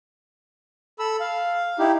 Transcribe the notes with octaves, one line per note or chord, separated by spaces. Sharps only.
A4 B5 E6
F5
D#4 E4 G4